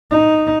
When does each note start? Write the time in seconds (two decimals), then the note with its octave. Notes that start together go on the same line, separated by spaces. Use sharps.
0.11 D#4